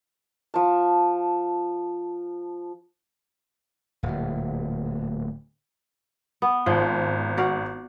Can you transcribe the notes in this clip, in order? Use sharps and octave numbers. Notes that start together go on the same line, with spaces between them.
F3 A5
D1 A#2
B3
G#1 F3
F#4 D5 F5